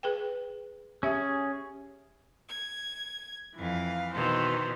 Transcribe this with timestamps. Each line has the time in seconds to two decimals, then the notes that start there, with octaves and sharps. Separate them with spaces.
0.03 G#4 B4 G5
1.03 C#4 G4 G#4 E5
2.48 G#6
3.56 F2 E3 F5
4.14 B2 D#3 E3 C5